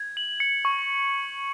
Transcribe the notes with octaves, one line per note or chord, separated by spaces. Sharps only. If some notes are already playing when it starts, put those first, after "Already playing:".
Already playing: G#6
F#7
C#7
C#6